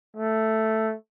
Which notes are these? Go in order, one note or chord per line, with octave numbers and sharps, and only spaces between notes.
A3